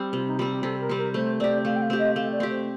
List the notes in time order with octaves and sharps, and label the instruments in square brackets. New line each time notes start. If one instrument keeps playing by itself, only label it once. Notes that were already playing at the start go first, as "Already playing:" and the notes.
Already playing: [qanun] G3 C4
[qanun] C3 [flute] F4
[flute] D#4
[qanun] G3 C4 [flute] F4
[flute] G4
[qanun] C3 [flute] A4
[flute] A#4
[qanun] G3 C4
[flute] A#4
[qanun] A3 [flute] C5
[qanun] C4 G4 [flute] D5
[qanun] A3 [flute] F5
[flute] G5
F5
[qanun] C4 G4
[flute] D#5
[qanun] A3 [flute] F5
[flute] D5
[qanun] C4 G4
[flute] C5